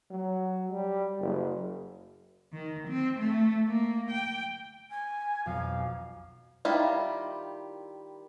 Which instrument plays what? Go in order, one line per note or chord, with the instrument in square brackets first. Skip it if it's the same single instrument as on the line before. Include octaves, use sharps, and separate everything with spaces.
[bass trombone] F#3
G3
F#1
[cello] D#3
C4
A3
A#3
G5
[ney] G#5
[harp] B1 F2 [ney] F5
[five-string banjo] D#3 G3 E4 F4